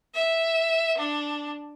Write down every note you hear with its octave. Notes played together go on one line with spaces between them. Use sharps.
E5
D4